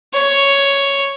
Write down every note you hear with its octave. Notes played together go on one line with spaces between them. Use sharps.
C#5